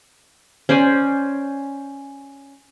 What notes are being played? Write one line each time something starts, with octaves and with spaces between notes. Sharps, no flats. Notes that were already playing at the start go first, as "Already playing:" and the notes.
C#4 C5 D5 G#5